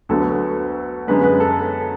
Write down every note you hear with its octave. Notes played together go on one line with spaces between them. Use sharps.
D2 D3 F#3 B3 A4
F#2 D3 G#3 B3 B4
B4
A4